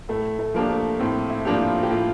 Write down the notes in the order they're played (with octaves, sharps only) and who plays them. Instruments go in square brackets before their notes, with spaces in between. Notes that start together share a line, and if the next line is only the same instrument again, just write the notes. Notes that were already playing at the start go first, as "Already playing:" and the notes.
[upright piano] A2 [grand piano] A3
[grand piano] A3
[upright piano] F3 A#3 D4 G4
[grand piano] A3
[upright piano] A2 [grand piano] C4
[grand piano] E4
[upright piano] F3 A#3 D4 G4
[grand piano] F4
G4
[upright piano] A2 [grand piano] F4